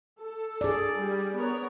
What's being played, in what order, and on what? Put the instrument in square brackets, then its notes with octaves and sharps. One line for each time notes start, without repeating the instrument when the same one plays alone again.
[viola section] A4
[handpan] G#4 D5
[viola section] G3
B3 A#4 C#5